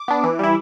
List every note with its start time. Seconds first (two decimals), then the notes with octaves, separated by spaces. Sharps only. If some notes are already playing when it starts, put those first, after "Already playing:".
Already playing: D6
0.08 B3 D4
0.24 E3
0.39 G3 E4